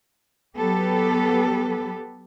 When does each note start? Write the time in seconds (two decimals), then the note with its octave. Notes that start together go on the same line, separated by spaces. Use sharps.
0.57 F#3 B3 G4 A4 B4